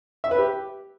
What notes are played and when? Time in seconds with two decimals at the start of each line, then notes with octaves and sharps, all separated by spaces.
0.24 E5
0.31 B4
0.38 G4